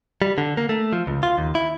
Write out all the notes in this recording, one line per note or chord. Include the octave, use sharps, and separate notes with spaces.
G3
D3
A#3
A3
F3
C#2
F4
D#2
E4